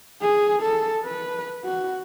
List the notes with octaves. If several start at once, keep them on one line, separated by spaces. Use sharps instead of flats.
G#4
A4
B4
F#4